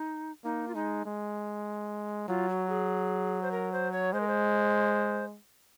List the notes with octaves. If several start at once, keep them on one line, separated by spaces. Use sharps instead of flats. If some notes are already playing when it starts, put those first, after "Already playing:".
Already playing: D#4
A#3 D#4
F4
G#3 D#4
G#3
F#3 F4
F#4
G#4
C5
A#4
C5
C#5
G#3 C5
A#4
C5